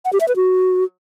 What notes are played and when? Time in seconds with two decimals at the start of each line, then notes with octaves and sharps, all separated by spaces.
0.05 F#5
0.13 G4
0.20 E5
0.28 B4
0.36 F#4